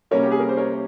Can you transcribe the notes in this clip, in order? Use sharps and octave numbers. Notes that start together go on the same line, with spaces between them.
C3 G3 A#3 C#4 A#4 C#5
G4
G#4
A#4
C5
A#4 C#5